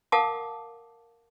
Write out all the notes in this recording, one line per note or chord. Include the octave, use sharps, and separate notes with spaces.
A#4 F5 F#5 A5 D6 D#6